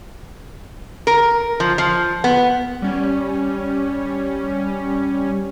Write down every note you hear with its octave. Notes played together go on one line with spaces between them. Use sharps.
A#4
F3
F3
B3
G3 C#4